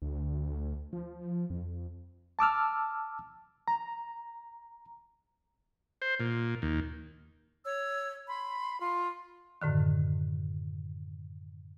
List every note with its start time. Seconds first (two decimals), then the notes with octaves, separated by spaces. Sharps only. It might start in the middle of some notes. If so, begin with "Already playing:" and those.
0.02 D2
0.93 F3
1.50 F2
2.39 A5 D6 E6 F6
3.68 A#5
6.02 C5
6.20 A#2
6.62 D#2
7.65 C#5 E6
8.28 B5 C6
8.79 F4
9.62 F#2 A2 D3 D#3